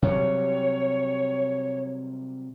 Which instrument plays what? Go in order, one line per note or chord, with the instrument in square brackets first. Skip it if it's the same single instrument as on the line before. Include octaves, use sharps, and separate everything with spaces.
[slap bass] C3 F#3 G3 [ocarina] C#5